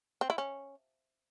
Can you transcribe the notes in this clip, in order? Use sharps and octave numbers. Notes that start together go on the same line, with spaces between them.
C4
E4
C#4